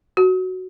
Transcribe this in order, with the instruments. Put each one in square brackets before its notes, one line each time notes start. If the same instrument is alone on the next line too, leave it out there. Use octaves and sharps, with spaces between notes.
[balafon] F#4